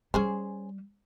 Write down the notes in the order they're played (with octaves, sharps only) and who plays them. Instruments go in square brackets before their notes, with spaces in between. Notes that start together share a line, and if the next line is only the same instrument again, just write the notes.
[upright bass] G3 [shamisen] C#4 G#4 C5